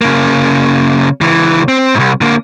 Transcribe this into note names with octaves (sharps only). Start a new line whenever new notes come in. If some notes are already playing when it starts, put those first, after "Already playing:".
C#3 A#3
C#2 E3
C4
C2 G#2
D3 A#3